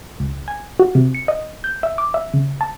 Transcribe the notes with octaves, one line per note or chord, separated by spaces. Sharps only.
C#2
G#5
F#4
C3
C#7
D#5
G6
E5
D6
E5
C#3
A5